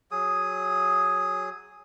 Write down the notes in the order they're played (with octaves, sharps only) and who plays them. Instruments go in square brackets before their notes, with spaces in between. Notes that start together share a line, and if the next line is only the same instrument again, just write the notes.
[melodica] F#3 G#4 D#6